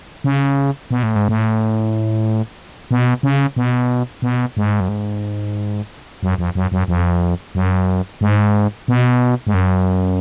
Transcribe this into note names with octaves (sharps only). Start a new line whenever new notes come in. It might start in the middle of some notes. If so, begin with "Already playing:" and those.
C#3
B2
A2
G#2
A2
B2
C#3
B2
B2
G#2
F#2
G#2
F#2
F2
F#2
F#2
F2
F#2
G#2
B2
G#2
F#2